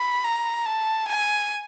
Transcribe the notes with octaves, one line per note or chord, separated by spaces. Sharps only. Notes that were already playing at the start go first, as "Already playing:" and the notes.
Already playing: B5
A#5
A5
G#5